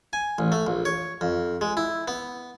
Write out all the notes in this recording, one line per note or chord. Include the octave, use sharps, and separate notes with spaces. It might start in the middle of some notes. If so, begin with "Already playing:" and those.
G#5
A1
A3
A#1
C#5
F2
G#3
E4
B3